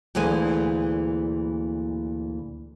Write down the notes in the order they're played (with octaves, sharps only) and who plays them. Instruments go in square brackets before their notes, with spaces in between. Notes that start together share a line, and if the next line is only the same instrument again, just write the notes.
[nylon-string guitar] D2 A#2 E3 G#3 G#5